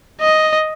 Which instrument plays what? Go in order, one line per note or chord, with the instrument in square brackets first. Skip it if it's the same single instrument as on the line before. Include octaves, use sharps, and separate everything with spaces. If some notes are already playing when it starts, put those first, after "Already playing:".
[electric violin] D#5